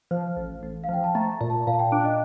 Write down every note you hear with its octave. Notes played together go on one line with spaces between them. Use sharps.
F3 C5
A1
A1
F5
F3 G5
A5
A3 A#5
A#2
A5
A#2 F5
A5
G5
D4
D#5